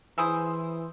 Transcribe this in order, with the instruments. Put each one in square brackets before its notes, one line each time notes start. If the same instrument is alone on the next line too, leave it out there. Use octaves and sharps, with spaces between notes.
[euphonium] E3 [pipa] E4 G#4 C5